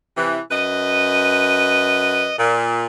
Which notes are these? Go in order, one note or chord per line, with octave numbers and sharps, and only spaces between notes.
C3 E3
F#2 B4 D#5
A#2